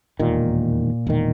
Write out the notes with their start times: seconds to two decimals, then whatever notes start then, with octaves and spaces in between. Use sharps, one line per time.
0.19 E1 D#2 A#2 D#3
1.07 E1 D#3